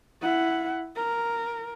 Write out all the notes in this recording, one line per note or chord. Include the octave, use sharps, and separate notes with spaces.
E4 F#5
A#4